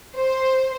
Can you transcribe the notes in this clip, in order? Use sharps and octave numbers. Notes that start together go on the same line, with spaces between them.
C5